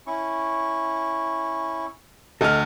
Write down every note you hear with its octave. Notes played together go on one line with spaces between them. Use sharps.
C#4 E4 C#6
D2 A4 D#5 F6